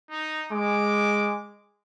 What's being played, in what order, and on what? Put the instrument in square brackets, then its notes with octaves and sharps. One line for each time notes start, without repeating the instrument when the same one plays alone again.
[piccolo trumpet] D#4
[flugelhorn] G#3 [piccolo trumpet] D6